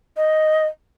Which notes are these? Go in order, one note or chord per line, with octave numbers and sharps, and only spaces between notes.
D#5